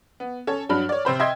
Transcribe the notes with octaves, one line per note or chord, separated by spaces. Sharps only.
B3
C#4 A4 C#5
G2 F#3 D4 B5 F6
C#5 D5
C3 C4 C5 B5
D#5 E5 G5 C6 G#6